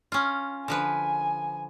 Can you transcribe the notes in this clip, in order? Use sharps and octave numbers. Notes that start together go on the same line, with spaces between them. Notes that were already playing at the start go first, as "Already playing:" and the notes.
C#4 F4
D3 F3 B4 G#5